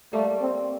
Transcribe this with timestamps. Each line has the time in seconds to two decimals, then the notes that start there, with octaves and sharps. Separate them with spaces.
0.13 G3 A3 A#3
0.42 C4